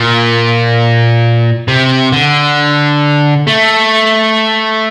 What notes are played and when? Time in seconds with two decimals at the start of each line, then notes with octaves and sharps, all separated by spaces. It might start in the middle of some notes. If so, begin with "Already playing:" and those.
Already playing: A#2
1.68 C3
2.12 D3
3.48 A3